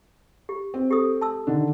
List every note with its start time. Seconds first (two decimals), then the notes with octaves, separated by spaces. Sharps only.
0.49 G4
0.74 C4
0.91 G4 A4 D#6
1.21 A5 C6 E6
1.47 D3 D#3 D4